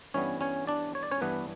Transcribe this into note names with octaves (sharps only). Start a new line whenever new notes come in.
G2 E3 G3 B3 C#4 C#5
C#4 C#5
D4 D5
C#5
D5
C#4 C#5
G2 E3 B3 D4 B4